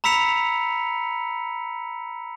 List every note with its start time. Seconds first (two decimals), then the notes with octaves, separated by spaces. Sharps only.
0.04 A#5 B5 E6 B6 C#7 F7